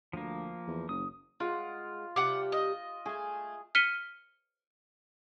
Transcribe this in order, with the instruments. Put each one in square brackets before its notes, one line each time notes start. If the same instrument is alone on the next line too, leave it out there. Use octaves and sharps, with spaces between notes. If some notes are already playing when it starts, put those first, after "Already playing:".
[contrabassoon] D2 [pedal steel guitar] F3 A#3
[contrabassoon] E2
[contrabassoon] F#1 [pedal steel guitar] D#6
[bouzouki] G#3 F#5 [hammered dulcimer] F4
[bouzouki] C3 G3 G4 [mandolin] F#5 D6
[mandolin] D#5
[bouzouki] A3 G#5 [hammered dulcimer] G#4
[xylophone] F6 B6 C#7 D#7 G7